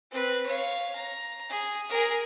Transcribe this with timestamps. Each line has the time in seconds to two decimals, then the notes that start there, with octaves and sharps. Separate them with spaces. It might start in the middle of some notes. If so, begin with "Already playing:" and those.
0.11 C4 B4
0.46 C#5 F5
0.95 A#5
1.49 G#4
1.89 G#4 A#4